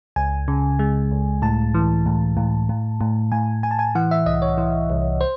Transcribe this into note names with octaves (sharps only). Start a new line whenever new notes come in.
C#2 G#5
C#3
G#3
C#2
A2 A5
E3
A2
A2
A2
A2
A2 G#5
A2 G#5
A5
G#5
E3 F#5
E5
C2 D#5
C#5
E3
C2
C5